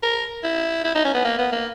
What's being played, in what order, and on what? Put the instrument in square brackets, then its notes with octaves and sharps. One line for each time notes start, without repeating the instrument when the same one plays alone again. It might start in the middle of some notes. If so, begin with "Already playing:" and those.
[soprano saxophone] A#4
E4
E4
D#4
C#4
B3
A#3
B3
A#3